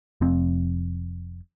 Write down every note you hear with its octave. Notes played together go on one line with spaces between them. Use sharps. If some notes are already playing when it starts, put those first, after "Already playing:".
F1 F3 C4